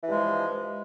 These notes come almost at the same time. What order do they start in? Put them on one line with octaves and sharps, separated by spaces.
E3 G2 G#3 F3